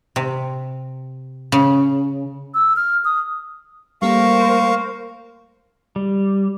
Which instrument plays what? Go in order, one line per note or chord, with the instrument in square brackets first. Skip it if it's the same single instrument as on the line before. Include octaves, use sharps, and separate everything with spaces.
[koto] C3
C#3
[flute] E6
F6
D#6
[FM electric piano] G3 A3 A#3 [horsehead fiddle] A#4 C5 [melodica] F5 C#6
[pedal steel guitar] G3